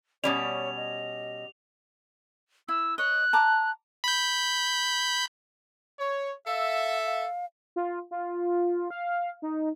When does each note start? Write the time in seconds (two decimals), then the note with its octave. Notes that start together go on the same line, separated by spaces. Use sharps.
0.24 B2 G3 C#4 C#5 D5 F7
0.77 D#5
2.68 E4 E6
2.98 C#5 D#5 F#6
3.33 A5 A#5 D6
4.04 B5 G6
5.99 C#5
6.47 A4 E5 F5
7.05 F5
7.76 F4
8.11 F4
8.90 F5
9.42 D#4